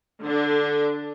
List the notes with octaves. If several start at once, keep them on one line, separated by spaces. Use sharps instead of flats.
D3 D4